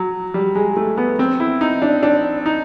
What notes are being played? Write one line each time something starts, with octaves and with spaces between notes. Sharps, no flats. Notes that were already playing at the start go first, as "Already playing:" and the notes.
Already playing: F#3
G3
G#3
A3
B3
C4
E4
D#4
D4
D4
D#4